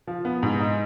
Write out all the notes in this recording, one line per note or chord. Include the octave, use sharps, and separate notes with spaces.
F3
B3
G#2
D#4